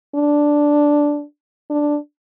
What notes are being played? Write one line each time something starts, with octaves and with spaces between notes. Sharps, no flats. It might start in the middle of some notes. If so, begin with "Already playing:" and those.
D4
D4